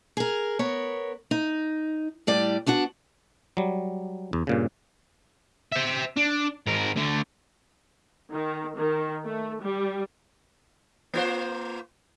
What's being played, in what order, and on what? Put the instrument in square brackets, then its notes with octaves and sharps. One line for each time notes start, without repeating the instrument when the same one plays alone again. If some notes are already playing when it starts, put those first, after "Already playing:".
[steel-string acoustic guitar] G#4 A#4
B3 A#4 C#5
D#4
A2 G3 D5
B3 D4 F#4 F#5
[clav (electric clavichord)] F#3 G3
E2
G2 A#2 C#3
[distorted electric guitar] C5 E5
D4
G#2 A#4
D2 D3
[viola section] D#3
D#3
A3
G3
[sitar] A#3 F4 C5